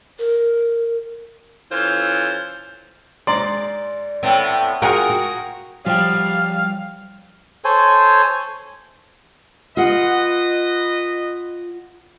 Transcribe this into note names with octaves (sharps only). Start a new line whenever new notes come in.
A#4
E3 C#4 F4 A4 C5
G#2 D5 A#5 C6
A2 B3 C4
F4 F#4 G#4 A#4 F#5 G5
F#4
F3 G3 F5 G5
A4 C5 C#5 G#5
F4 B4 D#5 F#5